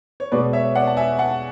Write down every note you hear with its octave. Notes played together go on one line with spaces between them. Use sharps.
C#5
B2 G#3 B4 D5
C#5 E5
D5 F#5
A5
E5 G#5
F#5 A5